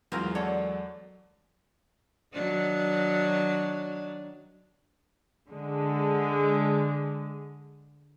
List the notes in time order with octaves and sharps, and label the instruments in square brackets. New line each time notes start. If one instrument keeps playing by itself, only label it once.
[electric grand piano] E2 F#3 G#3 [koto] C4 A#4 [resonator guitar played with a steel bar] E4 F4
[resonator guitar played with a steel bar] A4 D5 F#5 [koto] C#5
[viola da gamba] D#3 F#3 D4
[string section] D3 G#3